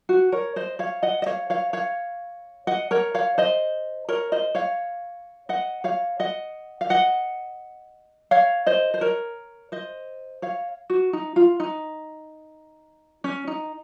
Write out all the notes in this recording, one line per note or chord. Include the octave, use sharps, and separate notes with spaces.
F#4
A#4 C#5
C5 D#5
C#5 F5
D#5 F#5
D#5
C#5 F5
C#5 F5
C#5 F5
D#5 F#5
A#4 C#5
C#5 F5
C5 D#5
A#4 C#5
C5 D#5
C#5 F5
D#5 F#5
C#5 F5
D#5 F#5
F5
D#5 F#5
C#5 F5
C5 D#5
C5
A#4 C#5
C5 D#5
C#5 F5
F#4
D#4
F4
D#4
C#4
D#4